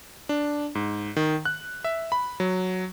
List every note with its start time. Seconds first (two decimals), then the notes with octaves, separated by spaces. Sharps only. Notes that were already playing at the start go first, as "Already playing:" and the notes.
0.29 D4
0.75 G#2
1.16 D#3
1.45 F#6
1.84 E5
2.12 B5
2.40 F#3